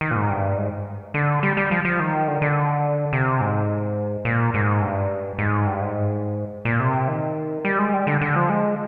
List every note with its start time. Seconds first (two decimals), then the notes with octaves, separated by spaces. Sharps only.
0.01 D#3
0.11 A#2
0.16 G#2
0.30 G2
0.57 G#2
1.14 D3
1.43 G3
1.57 G3
1.71 F3
1.85 F3
2.00 D#3
2.28 D3
2.42 D3
3.13 C3
3.41 G#2
4.25 A#2
4.54 G#2
4.82 G2
5.39 G#2
5.66 G2
5.81 G#2
6.65 A#2
6.80 C3
7.08 D#3
7.65 G3
7.79 G#3
7.93 G3
8.07 D3
8.21 D3
8.36 F3
8.50 G#3